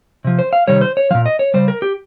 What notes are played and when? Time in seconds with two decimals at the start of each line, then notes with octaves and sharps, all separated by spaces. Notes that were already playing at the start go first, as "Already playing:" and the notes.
0.24 C3 F3
0.39 C5
0.53 F5
0.67 C3 D#3 G3 C#5
0.81 C5
0.97 C#5
1.11 A#2 F3 F5
1.26 D#5
1.39 C#5
1.54 C#3 G3 C5
1.68 A#4
1.82 G4